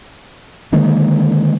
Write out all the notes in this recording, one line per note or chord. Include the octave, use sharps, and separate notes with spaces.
D3 D#3 G#3 A#3